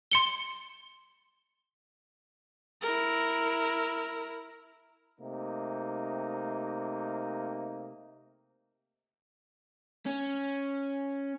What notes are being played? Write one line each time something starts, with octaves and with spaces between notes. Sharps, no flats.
C6 C#7 G7
E4 A#4
C3 A3 A#3 D#4
C#4